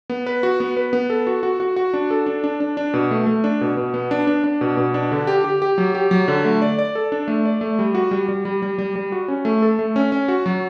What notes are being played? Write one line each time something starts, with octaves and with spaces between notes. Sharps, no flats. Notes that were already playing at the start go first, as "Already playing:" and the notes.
B3
B4
F#4
B3
B4
B3
A4
F#4
F#4
F#4
F#4
D4
A4
D4
D4
D4
D4
B2
A3
A3
D4
B2
B2
B3
D4
D4
D4
B2
B2
D4
D3
G4
G4
G4
F#3
G4
F#3
D3
A3
D5
D5
A4
D4
A3
D5
A3
G3
F#4
G3
G3
G3
G3
G3
G3
F#4
C#4
A3
A4
A3
C#4
C#4
F#4
F#3